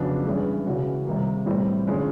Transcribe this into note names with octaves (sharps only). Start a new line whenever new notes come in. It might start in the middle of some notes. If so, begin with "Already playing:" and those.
Already playing: F2 C#3 F#3 B3 D4
G2 E3 G#3 C#4 E4
C#3 E3 G#3 C#4 F#4
C3 D#3 G3 A#3
A2 E3 G3 C4
D3 F3 G#3 C#4